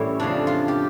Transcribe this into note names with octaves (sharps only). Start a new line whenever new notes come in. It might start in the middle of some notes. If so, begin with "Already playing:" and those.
Already playing: A2 E3 G3 C#4 E4 G4
F2 C#3 F3 D4
F4
G4